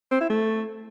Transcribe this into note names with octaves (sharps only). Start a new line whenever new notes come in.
C4
E4
A3